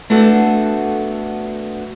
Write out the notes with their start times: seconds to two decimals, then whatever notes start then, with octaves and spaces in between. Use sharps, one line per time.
0.10 A3 B3 D4 F#4 A4